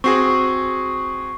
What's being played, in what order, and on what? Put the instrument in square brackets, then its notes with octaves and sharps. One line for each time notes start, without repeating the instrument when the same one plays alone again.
[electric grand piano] C4 F#4 G#4 [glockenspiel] C#6 C7